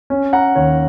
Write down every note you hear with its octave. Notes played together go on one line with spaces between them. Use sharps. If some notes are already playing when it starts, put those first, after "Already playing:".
C#4
F#5 A#5
D#2 C#5